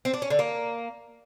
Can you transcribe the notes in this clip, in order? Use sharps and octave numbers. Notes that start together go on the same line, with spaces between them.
C4
D4
C#4
D3
A#3